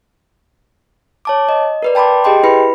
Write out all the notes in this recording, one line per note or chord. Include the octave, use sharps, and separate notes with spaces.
C#5 A5 D6
D#5
A#4 B4 D5
G5 A5 B5 C6 D6
G4 G#4 D#5 G5 C6
E4 B4 B5 C#7